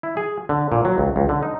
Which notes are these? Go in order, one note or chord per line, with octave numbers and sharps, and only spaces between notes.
E4
G#4
D3
A#2
F#3
C#2
C#2
D3
D#4